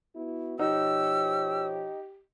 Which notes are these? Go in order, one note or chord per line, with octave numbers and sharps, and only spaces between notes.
B3 E4 F#4
B2 F3 D#4 G4 C#5 E6